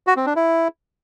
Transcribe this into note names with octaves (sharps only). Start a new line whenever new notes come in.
F#4
C4
D4
E4